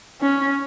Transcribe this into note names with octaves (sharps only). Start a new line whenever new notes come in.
C#4